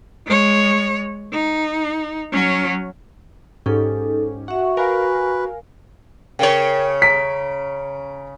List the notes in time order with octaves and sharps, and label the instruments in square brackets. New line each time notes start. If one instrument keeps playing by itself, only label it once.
[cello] G#3 C#5
D#4
F#3 C#4
[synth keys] G#2 C#4 G4 [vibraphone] D#4 A4
[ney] F#4 [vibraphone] E5 C#6 [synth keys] F#5
[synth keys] A#4 F5 [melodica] B4 [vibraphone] G#5
[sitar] C#3 C#5 [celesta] A#4 G5
[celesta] A#5 D7 [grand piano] B6